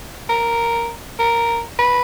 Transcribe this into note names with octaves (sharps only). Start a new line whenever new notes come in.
A#4
A#4
B4